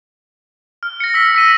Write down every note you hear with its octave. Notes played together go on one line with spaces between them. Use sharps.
F6
A#6 C#7
E6 B6
E6 B6 D#7